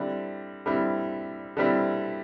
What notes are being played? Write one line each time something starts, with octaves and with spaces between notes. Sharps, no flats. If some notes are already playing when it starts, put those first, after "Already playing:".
Already playing: D3 G3 C4 E4
D3 G3 C4 E4
D3 G3 C4 E4